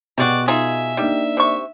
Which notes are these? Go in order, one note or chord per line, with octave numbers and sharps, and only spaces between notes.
B2 G3 G#3 F#4 D5
D#4 F4 G#4 E5
G3 A#3 D4 D#4
C3 C#6